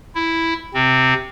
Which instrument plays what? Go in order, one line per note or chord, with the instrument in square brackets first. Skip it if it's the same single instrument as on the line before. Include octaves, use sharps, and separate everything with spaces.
[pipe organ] E4
C3 C4